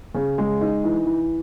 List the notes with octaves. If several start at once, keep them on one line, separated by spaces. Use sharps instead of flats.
C#3
G#3
D#4
E3
E3